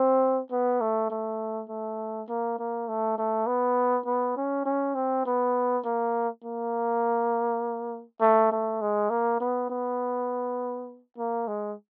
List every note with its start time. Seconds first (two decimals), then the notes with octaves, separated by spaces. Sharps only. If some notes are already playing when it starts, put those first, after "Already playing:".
Already playing: C4
0.52 B3
0.81 A3
1.11 A3
1.69 A3
2.29 A#3
2.59 A#3
2.88 A3
3.18 A3
3.47 B3
4.06 B3
4.37 C#4
4.65 C#4
4.95 C4
5.26 B3
5.85 A#3
6.44 A#3
8.21 A3
8.52 A3
8.81 G#3
9.10 A#3
9.41 B3
9.70 B3
11.18 A#3
11.48 G#3